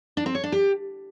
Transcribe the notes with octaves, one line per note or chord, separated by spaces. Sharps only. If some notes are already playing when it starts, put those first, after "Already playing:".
D4
C4
C#5
D4
G4